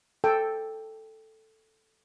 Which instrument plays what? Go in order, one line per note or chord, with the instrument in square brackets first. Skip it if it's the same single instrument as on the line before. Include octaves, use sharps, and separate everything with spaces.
[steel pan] A4 G5